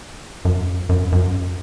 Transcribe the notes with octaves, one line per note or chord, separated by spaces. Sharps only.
F#2
F#2
F#2